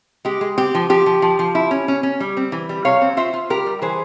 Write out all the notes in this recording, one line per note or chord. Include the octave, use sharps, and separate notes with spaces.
G#3 G4
G#3
C4 G4
F3
F3 G4
F3
F3
F3
E4
C#4
C#4
C#4
G3
C4
E3
G3
C3 C#5 F5
C4
F4 C5 E5
F4
G3 G4 A#4
G3
E3 G#4 C5